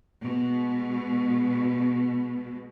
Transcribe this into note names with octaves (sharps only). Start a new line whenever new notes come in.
B2 G#3